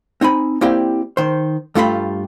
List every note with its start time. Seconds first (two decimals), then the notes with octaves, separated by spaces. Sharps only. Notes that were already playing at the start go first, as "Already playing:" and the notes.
0.21 C4 D#4 G#5 B5
0.61 A#3 C4 E4 G4 D5 G5
1.17 D#3 C5
1.75 G2 A3 F4 G4 A#4 B5